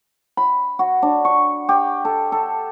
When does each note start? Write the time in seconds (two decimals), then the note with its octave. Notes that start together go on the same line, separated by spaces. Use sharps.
0.37 B5
0.79 F#4
1.02 D4
1.25 C#6
1.69 G4
2.05 A4
2.32 A4